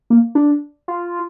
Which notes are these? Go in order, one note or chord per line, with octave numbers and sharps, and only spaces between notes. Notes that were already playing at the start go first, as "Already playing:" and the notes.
A#3
D4
F4